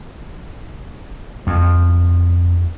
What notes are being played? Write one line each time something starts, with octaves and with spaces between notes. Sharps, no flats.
F2